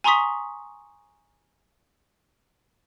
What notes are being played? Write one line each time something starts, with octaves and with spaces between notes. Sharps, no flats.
G#5 A#5 C6 C#6 D#6 B6